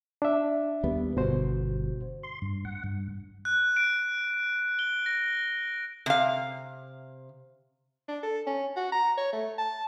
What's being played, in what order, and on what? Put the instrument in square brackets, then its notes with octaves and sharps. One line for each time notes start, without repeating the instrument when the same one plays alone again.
[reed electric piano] D4 E5
[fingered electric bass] D#2 G3 B3
[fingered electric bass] G1 [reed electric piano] B2 F#4 C5
[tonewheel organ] C6
G2
F#5
G2
[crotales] F#6
D7
G7
A#6
[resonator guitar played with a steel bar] C3 F5
[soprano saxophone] D4
A4
C#4
F#4
A#5
C#5
A3
A5